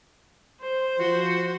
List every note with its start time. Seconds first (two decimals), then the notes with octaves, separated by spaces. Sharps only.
0.61 C5
0.99 F3 F#4